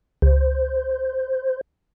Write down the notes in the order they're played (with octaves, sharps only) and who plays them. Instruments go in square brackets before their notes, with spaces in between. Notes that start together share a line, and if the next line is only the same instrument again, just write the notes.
[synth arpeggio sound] C#2 [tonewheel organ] C5